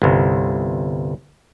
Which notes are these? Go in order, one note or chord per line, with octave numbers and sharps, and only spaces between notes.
G1 C2